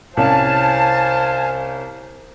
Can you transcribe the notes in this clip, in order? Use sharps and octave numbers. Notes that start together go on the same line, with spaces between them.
C2 C#4 C5 F5 G#5 A5